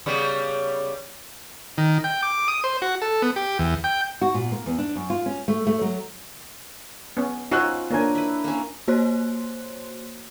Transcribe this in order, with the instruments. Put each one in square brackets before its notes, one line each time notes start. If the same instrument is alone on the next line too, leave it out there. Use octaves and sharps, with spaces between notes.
[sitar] C#3 G3 B3
[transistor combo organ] D#3
G5
D6
D#6
C5
F#4
A4
B3
G4
E2
G5
[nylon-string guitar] F#4
A#2
A#3
E2
D4
F#2
F4
C#4
A3
A3
F#3
[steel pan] B3 C#4
[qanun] C#4 F4 C5 [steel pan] D#4 F#4 C#5 [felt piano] E6 F#6
[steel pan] A#3 G#5 [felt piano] D4 A#4 C#5 [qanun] C5
[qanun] E4 B4
A#3 C#4
[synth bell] A#3 F#4 C5 C#5 C6 F#6